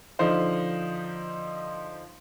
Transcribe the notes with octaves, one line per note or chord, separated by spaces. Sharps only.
D3 F3 D#4 C5 F5